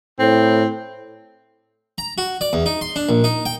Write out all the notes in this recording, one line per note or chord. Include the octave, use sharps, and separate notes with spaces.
A2 C4
A#5
F#4
D5
E2
D#4
C6
D4
A#1
D#4
G5